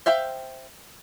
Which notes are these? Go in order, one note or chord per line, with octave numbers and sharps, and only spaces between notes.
C5 E5 F5 G5